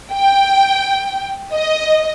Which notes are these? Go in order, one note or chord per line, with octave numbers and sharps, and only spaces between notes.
G5
D#5